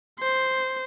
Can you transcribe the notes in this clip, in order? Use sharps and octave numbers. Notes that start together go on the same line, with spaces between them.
C5